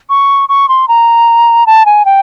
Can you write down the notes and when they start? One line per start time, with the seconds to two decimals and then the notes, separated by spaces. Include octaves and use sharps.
0.10 C#6
0.49 C#6
0.69 C6
0.88 A#5
1.67 A5
1.86 G#5
2.05 G5